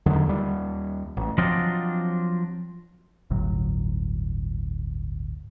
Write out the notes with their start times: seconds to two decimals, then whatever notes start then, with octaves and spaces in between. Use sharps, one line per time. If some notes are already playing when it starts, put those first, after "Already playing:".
0.06 E2 D3 D#3 F#3
0.26 D#2 G3
1.17 A1
1.38 F3 F#3 C4 D4 F4 D#5
3.30 G1 D2 A2 F#3